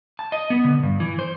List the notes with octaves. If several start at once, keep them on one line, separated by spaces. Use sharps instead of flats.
A5
D#5
B3
D3
G2
E3
C5